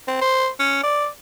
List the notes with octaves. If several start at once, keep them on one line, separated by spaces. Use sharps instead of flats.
C4
C5
C#4
D5